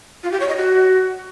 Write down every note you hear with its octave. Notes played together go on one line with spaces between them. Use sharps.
F4
G4
C#5
D#5
F#4